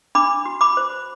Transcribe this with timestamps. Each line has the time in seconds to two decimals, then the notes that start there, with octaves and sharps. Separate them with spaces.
0.15 D4 B5 D6
0.45 F#4
0.61 B5 D6
0.77 C5